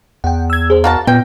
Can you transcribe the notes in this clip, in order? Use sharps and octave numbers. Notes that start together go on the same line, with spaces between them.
E2 F#5 G5
E6 G#6
G#4 C5
A#3 F#4 F5 A5
A#2 B3 G5